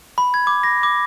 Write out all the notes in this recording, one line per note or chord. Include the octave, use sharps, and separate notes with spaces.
B5
G#6
D6
A#6
D6